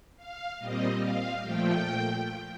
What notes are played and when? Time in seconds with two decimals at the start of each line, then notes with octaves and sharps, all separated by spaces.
0.17 F5
0.58 A#2 G3 C4 D#5
1.00 F5
1.41 A#2 F3 A3 G5